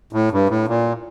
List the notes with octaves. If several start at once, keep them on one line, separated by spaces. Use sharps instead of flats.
A2
G2
A2
A#2